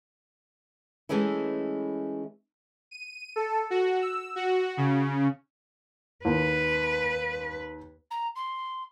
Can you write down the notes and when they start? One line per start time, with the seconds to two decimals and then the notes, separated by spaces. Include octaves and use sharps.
1.09 E3 G#3 A3 C#4 E4
2.91 D#7
3.36 A4
3.70 F#4
4.01 E6
4.36 F#4
4.77 C#3
6.25 D#2 B4
8.11 A#5
8.36 C6